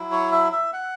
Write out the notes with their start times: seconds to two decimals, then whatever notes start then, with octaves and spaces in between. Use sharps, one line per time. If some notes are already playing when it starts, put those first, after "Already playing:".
Already playing: F#3 E4
0.12 C#5
0.32 E5
0.52 E5
0.73 F#5